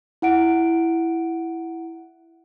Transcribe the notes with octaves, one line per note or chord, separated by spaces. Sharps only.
E4 F#5 D7